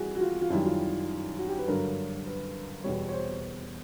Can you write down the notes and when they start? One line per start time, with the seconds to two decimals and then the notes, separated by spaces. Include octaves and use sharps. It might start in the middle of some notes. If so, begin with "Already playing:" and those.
Already playing: E3 G3 F#4 G#4
0.15 F#4
0.21 F4
0.42 F4
0.50 F#2 D#3 G3 E4
0.65 F4
1.38 F#4
1.48 G4
1.58 B4
1.68 G2 D3 F#3 A#4
2.26 B4
2.84 E2 B2 G3 C#5
3.08 C#5
3.13 C5